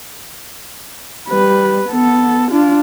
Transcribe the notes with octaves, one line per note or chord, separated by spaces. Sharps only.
G3 B4
B3 A4
D4 F4